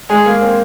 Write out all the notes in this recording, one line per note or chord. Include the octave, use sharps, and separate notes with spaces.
G#3 G#4
A#3
C4